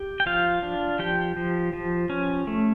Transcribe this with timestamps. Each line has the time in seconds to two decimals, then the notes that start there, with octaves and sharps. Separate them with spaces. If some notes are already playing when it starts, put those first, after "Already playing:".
Already playing: G4
0.20 G5
0.26 F3 F4 F5
0.62 D4
0.99 F3 G4 G5
1.37 F3
1.73 F3
2.10 C#4
2.47 A3